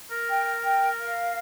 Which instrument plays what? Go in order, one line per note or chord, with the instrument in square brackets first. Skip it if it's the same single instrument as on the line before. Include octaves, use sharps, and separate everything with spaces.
[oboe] A#4
[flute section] G5
G5
F5